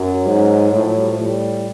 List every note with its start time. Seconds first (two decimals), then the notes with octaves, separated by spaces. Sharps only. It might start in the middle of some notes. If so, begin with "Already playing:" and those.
Already playing: F#2 F#3
0.26 G#2
0.72 A2 F3
0.83 F#3
0.96 G3
1.07 F3
1.18 A2 G3